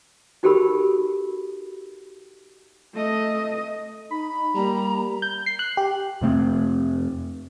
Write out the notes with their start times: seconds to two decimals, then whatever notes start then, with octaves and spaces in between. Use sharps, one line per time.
0.43 D#4 F#4 G4 A4 A#4 B5
2.94 A3 D#5
4.11 D#4 B5
4.55 G3 A#3 A#5
5.22 G6
5.46 C7
5.59 F#6
5.77 G4
6.21 F2 C3 A3 C4